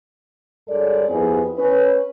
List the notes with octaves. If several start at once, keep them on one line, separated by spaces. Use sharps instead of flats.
G2 G#3 A4 A#4 C#5 D5
F2 B3 C4 E4 G4 G#4
C#4 B4